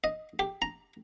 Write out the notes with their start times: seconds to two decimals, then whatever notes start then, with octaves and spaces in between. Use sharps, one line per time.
0.04 D#5
0.39 G4
0.62 A#5